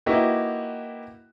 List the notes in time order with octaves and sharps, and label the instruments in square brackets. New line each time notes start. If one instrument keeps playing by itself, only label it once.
[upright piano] A#3 D#4 E4 F#4 G4 B4